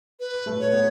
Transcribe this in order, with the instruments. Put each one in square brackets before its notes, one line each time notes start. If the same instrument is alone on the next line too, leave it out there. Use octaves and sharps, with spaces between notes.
[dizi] B4
[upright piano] A3 A4
[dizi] C#5
[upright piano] B3 B4